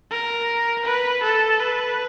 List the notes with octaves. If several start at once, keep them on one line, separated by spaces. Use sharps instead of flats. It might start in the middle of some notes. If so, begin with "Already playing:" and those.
A#4
B4
A4
B4